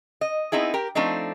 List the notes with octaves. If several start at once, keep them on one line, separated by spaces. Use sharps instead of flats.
D#5
B3 C4 D#4 E4 G#4
G4 A#4
F3 A3 C4 D4 D#4